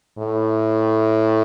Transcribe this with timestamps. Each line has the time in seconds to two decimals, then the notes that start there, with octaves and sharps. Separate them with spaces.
0.18 A2